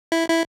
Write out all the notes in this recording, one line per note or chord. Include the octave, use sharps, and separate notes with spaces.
E4
E4